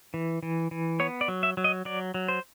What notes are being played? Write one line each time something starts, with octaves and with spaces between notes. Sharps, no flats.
E3
E3
E3
B3 C#5
D5
F#3
E5
F#3
D#5
F#3 D5
F#3
C5